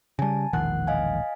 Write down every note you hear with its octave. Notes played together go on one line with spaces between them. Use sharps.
C#3 G3 G#5 A5
E1 A#1 D#3 F#5 F#6
D#5 F5 G#5